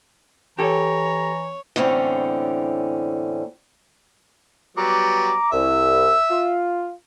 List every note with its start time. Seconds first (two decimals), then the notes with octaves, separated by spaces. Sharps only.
0.59 E3 G4 A4 C#5 A#5
1.76 E2 A2 D3 C4 C#4
4.77 F#3 G3 B3 A#5 D6
5.52 C2 E5
6.30 F4